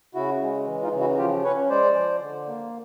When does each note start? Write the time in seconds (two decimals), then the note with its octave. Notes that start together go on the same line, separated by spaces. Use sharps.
0.15 C#3 E4 F#4
0.41 G#3
0.66 E3
0.83 D#4 F4
0.93 C#3
1.01 E4 F#4
1.18 F3 F4 G4
1.44 C#4 B4 C#5
1.70 G#3 C5 D5
1.96 F3
2.21 D3
2.48 A#3